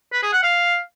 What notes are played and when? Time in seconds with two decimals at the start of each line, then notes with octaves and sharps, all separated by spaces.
0.13 B4
0.23 G#4
0.33 F#5
0.43 F5